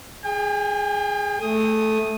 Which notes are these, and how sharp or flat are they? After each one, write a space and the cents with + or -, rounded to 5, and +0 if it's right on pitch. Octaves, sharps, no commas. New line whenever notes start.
G#4 +0 G5 +40
A3 -10 D#6 +0